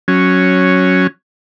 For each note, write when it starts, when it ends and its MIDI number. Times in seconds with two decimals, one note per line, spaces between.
0.08 1.07 54
0.08 1.07 61